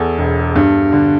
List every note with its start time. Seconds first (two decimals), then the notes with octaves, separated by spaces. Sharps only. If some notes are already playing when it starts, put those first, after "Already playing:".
Already playing: E2 A4
0.18 E1
0.56 G2
0.92 D3